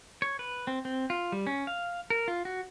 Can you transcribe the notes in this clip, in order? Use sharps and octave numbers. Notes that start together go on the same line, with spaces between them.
C#5
B4
C4
C4
F4
G3
C#4
F5
A#4
F4
F#4